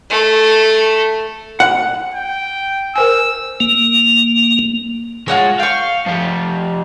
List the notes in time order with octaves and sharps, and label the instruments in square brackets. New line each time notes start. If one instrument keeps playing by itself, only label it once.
[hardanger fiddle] A3
[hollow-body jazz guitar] F#5
[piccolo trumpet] G5
[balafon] A#4 C5 G#5 [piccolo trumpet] E6
[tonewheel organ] A#3
[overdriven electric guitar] G#3 [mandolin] F4 F#4 C#5
[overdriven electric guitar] F5 [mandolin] G5 C#6
[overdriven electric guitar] F3 G4